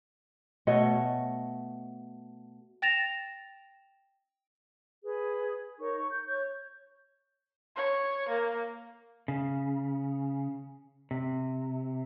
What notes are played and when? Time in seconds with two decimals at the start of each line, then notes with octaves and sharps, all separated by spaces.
0.67 B2 A3 C#5 D#5
2.82 G5 A6 A#6 E7 F7
5.04 G#4 B4
5.80 D#4 A#4 C#5 C#6
5.98 C#6
6.11 G6
6.28 C#5 C#6 G6
7.77 C#5
8.29 A#3
9.28 C#3
11.11 C3